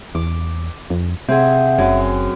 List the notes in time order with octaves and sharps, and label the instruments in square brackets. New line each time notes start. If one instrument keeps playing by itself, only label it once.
[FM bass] E2 [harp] D6
[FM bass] F2
[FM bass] C3 [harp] C4 G#4 [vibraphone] E5 F#5
[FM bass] F#1 [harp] F#2